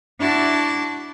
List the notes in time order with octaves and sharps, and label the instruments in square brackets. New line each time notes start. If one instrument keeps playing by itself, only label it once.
[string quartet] D4 E4 F#4 A5 D6